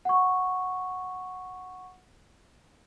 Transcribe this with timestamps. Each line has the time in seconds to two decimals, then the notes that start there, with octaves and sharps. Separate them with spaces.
0.05 F#5 C#6